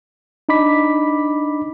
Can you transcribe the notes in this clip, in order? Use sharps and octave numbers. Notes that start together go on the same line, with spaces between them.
D4 D#4 D#5 B5 D6 B6